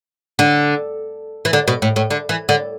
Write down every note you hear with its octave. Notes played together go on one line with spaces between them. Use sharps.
D3
E3
D3
B2
A2
A2
D3
E3
D3